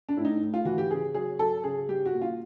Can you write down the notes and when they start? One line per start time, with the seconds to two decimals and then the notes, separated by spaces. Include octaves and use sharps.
0.09 D4
0.17 A2 E4
0.25 D#4
0.42 A2
0.54 F4
0.65 E3 F#4
0.78 G4
0.90 C#3 G#4
1.14 F#3 G#4
1.39 F#3 A4
1.64 C#3 G#4
1.88 G3 G4
2.06 F#4
2.13 A#2
2.22 F4